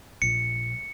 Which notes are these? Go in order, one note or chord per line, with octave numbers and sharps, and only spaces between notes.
A#1 C#7